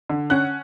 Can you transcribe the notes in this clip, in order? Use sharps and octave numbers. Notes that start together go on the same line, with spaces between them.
D3
C#4 F#5 F#6